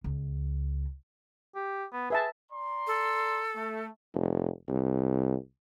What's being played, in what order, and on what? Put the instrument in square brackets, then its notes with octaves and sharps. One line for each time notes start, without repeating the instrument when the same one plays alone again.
[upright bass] C#2
[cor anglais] G4
B3
[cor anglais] G#4 [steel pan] B4 E5 A5
[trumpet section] D5 A#5 C6
[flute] A4
[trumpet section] A3
[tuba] F1
C2